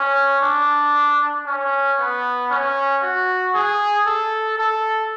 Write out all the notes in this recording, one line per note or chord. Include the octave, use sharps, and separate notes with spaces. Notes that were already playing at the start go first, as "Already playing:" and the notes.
Already playing: C#4
D4
C#4
B3
C#4
F#4
G#4
A4
A4